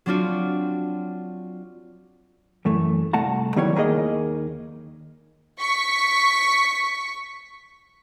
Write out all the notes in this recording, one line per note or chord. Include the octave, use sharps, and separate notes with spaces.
F#3 C4 D4 F4 F#4
F#2 E3 A3
C2 A3 F#5 A5 A#5
D#3 F#3 G3 B3 E4 C#5
D#2 D#3 A#3 G#4 D#5
C#6 B6